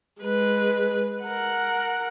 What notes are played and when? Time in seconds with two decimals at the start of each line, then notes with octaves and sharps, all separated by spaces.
0.22 G#3 B4
1.23 A#4 F#5